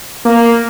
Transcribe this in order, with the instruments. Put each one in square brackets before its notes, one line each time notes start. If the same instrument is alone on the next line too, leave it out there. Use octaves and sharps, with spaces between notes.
[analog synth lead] A#3